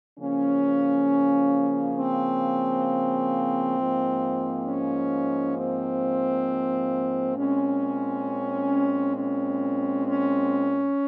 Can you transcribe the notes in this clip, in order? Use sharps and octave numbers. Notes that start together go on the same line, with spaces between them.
C#3 F3 A#3 C#4
C4
G#2 F3 A#3
C#4
C4
A#2 G#3 C4 C#4
C#4
C#4